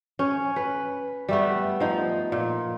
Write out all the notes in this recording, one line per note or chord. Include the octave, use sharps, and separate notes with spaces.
C#4
B4
G3 A3 B3
F3 D#4
A#2